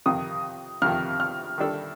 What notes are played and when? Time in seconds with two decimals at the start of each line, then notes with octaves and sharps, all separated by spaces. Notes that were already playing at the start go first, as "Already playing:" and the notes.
0.06 F2 C3 D#3 D#6
0.82 F2 C3 D#3 F6
1.20 F6
1.58 D#3 G3 D4 A4